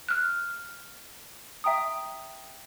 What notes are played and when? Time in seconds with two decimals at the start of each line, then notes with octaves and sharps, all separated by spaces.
0.09 F6 F#6
1.64 E5 G5 A#5 D#6